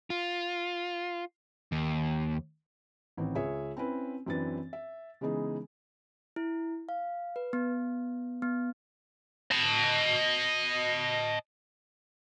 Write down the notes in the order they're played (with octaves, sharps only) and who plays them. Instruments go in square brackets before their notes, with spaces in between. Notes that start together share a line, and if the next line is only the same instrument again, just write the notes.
[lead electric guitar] F4
D#2
[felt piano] A1 D#3 C4
C#2 G#4 C#5 E5
C4 C#4 E4 B4
F#2 E3 C4 D4 B4 A6
E5
C#3 E3 G#3 B3 D#4 G#4
[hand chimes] E4
F5
B4
B3
B3
[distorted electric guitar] D#5 A5